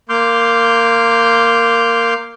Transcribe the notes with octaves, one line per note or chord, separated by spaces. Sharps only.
A#3 C6 D6 F6 G6